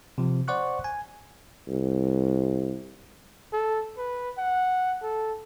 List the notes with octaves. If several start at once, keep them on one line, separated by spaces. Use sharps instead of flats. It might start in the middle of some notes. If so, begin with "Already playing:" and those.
C3 F3
C5 D5 F#5 C#6 F#6
G#5
C2
A4
B4
F#5
A4